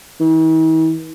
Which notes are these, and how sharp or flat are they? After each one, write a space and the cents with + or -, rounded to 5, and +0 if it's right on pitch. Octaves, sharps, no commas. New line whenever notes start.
E3 -45